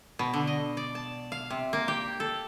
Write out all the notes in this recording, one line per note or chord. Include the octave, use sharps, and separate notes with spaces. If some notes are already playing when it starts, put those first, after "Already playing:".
B2
D3
D#5
D5
A5
F5
C3
A#3
G4
A4